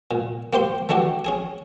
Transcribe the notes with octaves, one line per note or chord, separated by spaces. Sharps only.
A#2
A#3 G4 C5 C6
E3 A3 D4 F#4 G4
C#4 G#4 G#5